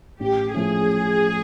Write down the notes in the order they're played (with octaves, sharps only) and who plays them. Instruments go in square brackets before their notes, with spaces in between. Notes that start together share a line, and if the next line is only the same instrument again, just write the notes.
[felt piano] A1 [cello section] G4
[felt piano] A2 F3 A3 C#4 [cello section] G#4